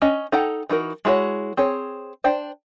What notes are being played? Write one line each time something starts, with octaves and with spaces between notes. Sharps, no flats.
C#4 D#5
D#4 A4 F#5 G5 A#5
E3 D#4 F#4 A#4
G#3 E4 F#4 C5 C#5
C4 G#4 C#5
D4 C5 G5